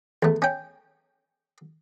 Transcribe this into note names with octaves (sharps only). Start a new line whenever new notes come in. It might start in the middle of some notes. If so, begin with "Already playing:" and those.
E2 A3
C#4 G5